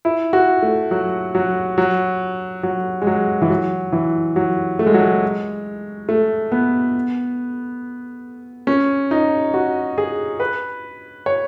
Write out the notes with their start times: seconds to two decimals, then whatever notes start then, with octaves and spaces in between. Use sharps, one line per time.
0.05 E4
0.33 F#4
0.62 A3
0.91 F#3
1.35 F#3
1.78 F#3
2.63 F#3
3.02 G#3
3.07 F#3
3.42 E3
3.50 F#3
3.93 E3
4.36 F#3
4.79 A3
4.86 G#3
4.94 F#3
5.01 G#3
6.09 A3
6.52 B3
8.67 C#4
9.11 D#4
9.54 F#4
9.98 G#4
10.40 B4
11.26 C#5